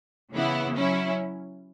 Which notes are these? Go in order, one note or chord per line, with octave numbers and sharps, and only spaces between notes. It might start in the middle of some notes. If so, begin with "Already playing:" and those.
C#3 E3 B3 E4
F#3 C#4 E4